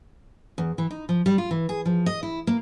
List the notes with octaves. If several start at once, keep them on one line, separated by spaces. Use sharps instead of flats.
E2
E3
D#4
F3
G3
F4
E3
G#4
F3
D#5
E4
A#3